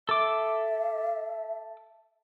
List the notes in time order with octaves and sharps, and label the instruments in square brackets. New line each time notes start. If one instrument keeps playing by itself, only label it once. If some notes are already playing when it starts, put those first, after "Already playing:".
[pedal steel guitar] A4 D6 [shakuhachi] E5